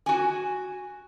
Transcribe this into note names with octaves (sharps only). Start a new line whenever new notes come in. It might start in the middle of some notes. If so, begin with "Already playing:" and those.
F#4 G#5